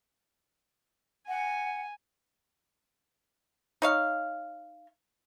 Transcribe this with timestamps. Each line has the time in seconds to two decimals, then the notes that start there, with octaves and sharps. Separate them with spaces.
1.28 F#5 G#5
3.82 D#4 C#5 F5